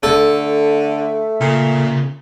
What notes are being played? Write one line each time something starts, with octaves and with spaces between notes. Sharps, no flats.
D3 A3 A4
A#2 C#3